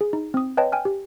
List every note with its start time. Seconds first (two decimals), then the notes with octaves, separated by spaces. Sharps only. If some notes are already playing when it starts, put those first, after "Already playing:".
0.01 G#4
0.13 D#4
0.34 C4 D#6
0.57 B4 C#5 D#5 G5 A5
0.72 G5 G#5 F6
0.85 G4